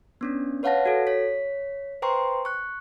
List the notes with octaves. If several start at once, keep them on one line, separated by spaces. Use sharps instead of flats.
B3 C#4 D4
B4 C#5 F5 F#5 A5 A#6
F#4 A4
C#5 B6
B4 C5 G5 A#5 C6 C#6
C#6 F#6